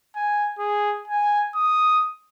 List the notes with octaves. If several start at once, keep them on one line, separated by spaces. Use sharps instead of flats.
G#5
G#4
G#5
D#6